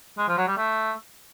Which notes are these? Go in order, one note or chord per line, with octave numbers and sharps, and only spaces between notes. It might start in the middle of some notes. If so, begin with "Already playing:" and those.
G#3
F3
F#3
G3
A3